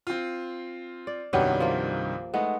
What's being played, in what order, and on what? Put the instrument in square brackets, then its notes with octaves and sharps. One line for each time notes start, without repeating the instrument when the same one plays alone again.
[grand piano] C4 F4
[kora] D5
[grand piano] C2 G2 D#3 [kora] F#3 B3 G4
[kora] F3 A#3
[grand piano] G#3 A3 D#4 [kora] B3